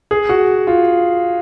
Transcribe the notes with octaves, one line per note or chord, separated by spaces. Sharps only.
G#4
F#4
F4